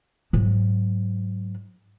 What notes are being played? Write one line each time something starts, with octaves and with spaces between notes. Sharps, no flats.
G#2 F#3